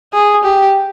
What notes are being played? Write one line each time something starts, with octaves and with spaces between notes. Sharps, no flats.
G#4
G4